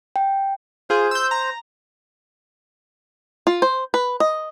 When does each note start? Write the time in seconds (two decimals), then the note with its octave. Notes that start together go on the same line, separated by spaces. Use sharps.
0.16 G5
0.90 F4 G#4 C5
1.11 E6 G6
1.31 A#5
3.47 F4
3.62 C5
3.94 B4
4.20 D#5